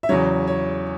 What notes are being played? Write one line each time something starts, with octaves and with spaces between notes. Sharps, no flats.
E5
E2 C#3 F#3 C#5
C#5